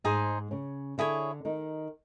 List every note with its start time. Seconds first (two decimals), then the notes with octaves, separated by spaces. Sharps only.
0.04 G#2 G#3 D#4 G#4 C5
0.51 C#3 C#4
0.98 D3 D4 E4 G#4 C#5
1.45 D#3 D#4